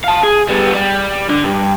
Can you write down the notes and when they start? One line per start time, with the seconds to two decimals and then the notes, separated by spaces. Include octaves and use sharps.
0.04 F5 A5
0.23 G#4
0.48 G3 B3
0.74 G3
1.30 D3
1.44 G2